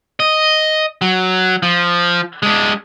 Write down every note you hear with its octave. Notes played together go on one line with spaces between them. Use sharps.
D#5
F#3
F3
G#3 D4